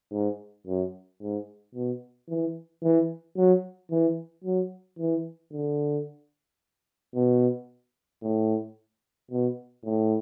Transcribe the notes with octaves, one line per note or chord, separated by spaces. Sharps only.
G#2
F#2
G#2
B2
E3
E3
F#3
E3
F#3
E3
D3
B2
A2
B2
A2